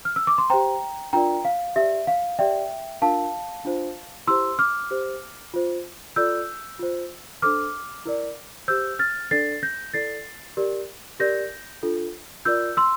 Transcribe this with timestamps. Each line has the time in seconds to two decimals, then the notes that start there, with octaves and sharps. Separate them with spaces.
0.05 F6
0.16 E6
0.27 D6
0.38 C6
0.50 G4 C5 G5 A#5
1.13 D4 F4 A#4 D5 G5 A#5
1.45 F5
1.76 G4 D5 E5
2.07 F5
2.39 G4 D5 E5 G5
3.02 D4 F4 A#4 F5 A5
3.65 D4 F4 C5
4.27 E4 G4 C5 C6 E6
4.59 D6 F6
4.91 G4 C5
5.54 F4 C5
6.16 F4 A4 D5 E6 G6
6.79 F4 C5
7.42 D4 A4 C5 D6 F6
8.06 E4 A#4 D5
8.68 G4 C5 E6 G6
8.99 F6 A6
9.31 D4 A4 D5 A6 C7
9.63 G6 A#6
9.94 E4 A4 D5 A6 C7
10.57 G4 A#4 D5
11.20 G4 A#4 D5 G6 A#6
11.83 D4 F4 A4
12.45 F4 A#4 D5 E6 G6
12.77 C6 E6